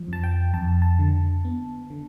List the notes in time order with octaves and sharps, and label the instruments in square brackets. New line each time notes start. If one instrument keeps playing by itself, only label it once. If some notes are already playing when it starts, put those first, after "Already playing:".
Already playing: [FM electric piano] F3
F2 A5
G5
F2 A5
A5
D3
B3
D3